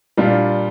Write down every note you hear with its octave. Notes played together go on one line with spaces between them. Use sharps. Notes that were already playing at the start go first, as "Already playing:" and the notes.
A#2 G3 D4 F4